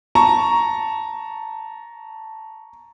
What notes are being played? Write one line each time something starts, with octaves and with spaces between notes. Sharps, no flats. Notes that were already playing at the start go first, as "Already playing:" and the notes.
A5 A#5 C#6